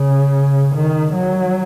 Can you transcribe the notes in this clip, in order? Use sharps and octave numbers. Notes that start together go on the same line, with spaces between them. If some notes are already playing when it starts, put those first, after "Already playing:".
Already playing: C#3
D#3
F#3